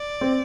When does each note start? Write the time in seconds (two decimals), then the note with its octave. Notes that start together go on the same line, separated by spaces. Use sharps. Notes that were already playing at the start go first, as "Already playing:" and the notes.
Already playing: D5
0.21 C4